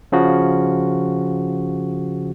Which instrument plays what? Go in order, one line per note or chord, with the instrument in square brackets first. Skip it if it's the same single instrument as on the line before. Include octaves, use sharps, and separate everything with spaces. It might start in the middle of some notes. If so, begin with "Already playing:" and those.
[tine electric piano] C#3 F3 F#4